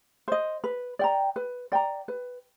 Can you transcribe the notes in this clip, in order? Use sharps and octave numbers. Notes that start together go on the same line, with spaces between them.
C5 D#5
B4
D5 G5 A#5
B4
D5 G5 A#5
B4